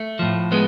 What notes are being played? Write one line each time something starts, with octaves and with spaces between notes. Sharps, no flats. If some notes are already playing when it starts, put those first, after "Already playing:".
Already playing: A3
A2 F3
G#3 B3